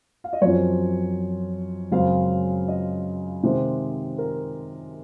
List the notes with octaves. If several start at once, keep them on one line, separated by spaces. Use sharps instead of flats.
F5
D#5
F#2 F3 C4 C#5
F#2 C#3 G#3 C4 F5
D#5
C3 D#3 G#3 C4
A#4